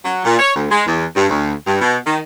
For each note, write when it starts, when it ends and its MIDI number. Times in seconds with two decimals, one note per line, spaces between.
0.05 0.25 54
0.25 0.37 46
0.39 0.55 73
0.55 0.67 38
0.71 0.82 56
0.87 1.05 40
1.16 1.27 43
1.30 1.53 38
1.67 1.80 43
1.81 1.98 47
2.06 2.18 51